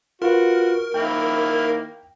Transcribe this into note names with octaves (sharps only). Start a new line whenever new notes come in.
F4 F#4 A#4 B4
D#3 A#3 E4 G5